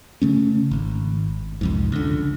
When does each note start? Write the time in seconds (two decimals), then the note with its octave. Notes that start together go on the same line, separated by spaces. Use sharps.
0.22 C#3 A3 C#4
0.71 G#1
1.61 C2 F2 G#2
1.92 C#2 D3